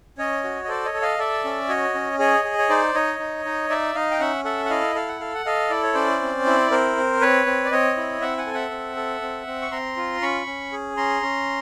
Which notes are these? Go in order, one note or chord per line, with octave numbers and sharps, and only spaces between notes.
C#4 C#5 D#5
F#4
D#5
A4 C5 D5
C#5 D#5
A4
D#5 F5
A4 D5 E5
C#4
F#4 C#5 D#5
C#4
G#4 C#5 D#5
G#4
C#5
D#4 C5 D5
D#4 C#5 D#5
D#4
D#4
D#4 D5 E5
D#4 D#5 F5
G5
C#4 E5 F#5
A4 E5 F#5
F#5
E4 D#5 F5
A4 F5
F#5
A4 F5
F#5
A4 D#5 F5
E4 D5
C#5
C#4 C5 D5
C4
E4
C4 A#4 C5
C4
C4 B4 C#5
C4
D5
C4 C#5 D#5
E4
C4 E5 F#5
F#5 G#5
A4
E5 F#5
C4
A4
C4
C4
C#6
C4 A#5 C6
F4
C#4 B5 C#6
C#4
G#4
C#4 A#5 C6
C#4